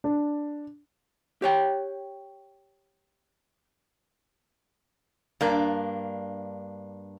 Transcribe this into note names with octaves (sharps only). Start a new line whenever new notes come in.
D4
G4 C#5 G5
G2 A#3 D4